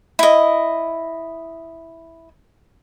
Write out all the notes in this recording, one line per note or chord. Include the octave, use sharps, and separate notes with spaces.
E4 D#5